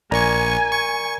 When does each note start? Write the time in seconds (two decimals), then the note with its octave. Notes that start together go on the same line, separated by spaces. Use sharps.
0.11 A#1 A#4 D5 G#5 A#5 C#6
0.72 C#6